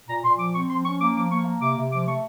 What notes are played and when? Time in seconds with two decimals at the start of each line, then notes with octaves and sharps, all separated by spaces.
0.09 A#2 A#5
0.24 A#2 C6
0.38 F3 D6
0.53 C4 C#6
0.69 F3 C6
0.84 C#4 C#6
0.99 A#3 D6
1.15 F3 D6
1.30 A#3 C#6
1.46 A#3
1.60 C3 D6
1.76 C3
1.92 F3 D6
2.07 A3 C#6